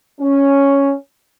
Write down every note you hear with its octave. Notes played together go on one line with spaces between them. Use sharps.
C#4